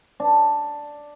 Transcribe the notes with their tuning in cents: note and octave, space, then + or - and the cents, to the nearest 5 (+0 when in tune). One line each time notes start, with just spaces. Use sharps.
D4 +0